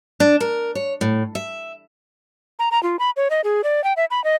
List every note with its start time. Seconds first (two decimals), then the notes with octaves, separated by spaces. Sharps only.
0.20 D4
0.40 A#4
0.75 C#5
1.01 A2
1.35 E5
2.59 A#5
2.71 A#5
2.83 F4
2.99 B5
3.17 C#5
3.30 D#5
3.44 G#4
3.64 D5
3.84 G5
3.97 E5
4.11 B5
4.24 D#5